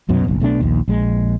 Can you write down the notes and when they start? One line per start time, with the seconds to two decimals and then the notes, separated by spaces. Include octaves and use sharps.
0.09 C2 F#2 B2 F#3
0.27 F#1 B1
0.40 B1 B2 A3 D4
0.60 A#1 D#2
0.88 A#1 G#3